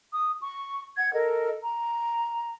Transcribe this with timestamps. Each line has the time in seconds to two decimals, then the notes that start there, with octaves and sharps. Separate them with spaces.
0.12 D#6
0.41 C#6
0.96 F#5 G#6
1.14 A4 A#4 D#5
1.61 A#5